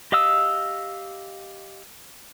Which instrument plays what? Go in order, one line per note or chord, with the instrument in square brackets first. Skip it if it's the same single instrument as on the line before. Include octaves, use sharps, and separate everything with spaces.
[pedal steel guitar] G4 D#5 F5 D#6 E6